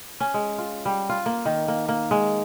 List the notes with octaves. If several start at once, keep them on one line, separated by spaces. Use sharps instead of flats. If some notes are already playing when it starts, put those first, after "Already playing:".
C#4
G#3
F4
G3
F4
A#3
D#3
A#3
A#3
G#3